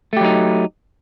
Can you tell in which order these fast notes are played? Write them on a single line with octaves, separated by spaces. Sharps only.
A3 G4 F#3 D#4